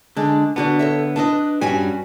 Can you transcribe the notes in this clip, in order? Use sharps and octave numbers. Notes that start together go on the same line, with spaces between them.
D3 G#3 D4
D3 B3 D4 F#4 D5
A4 C#5 E5
D4 B4 D#5
G2 G3 C#4 F#4 G#5